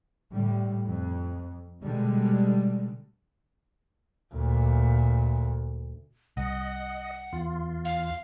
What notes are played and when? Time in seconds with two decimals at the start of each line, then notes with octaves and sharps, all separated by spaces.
0.31 A2 D3 G3
0.88 F2
1.82 B2 D3 G3 G#3
4.34 D2 A#2
6.37 C2 D#5 F#5
7.33 E2 F4
7.85 F5